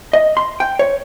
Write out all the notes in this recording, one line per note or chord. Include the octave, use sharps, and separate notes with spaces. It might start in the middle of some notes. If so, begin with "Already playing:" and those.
D#5
C6
G5
C#5